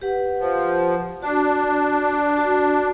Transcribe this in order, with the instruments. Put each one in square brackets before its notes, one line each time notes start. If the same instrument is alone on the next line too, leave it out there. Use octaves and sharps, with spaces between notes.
[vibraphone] G4 B4 F#5
[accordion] F3
[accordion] D4 [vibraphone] F#4 D5
[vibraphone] F#4